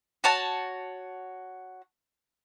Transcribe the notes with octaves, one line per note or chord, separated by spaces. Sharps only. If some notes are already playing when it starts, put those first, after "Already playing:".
F#4 C#5 A5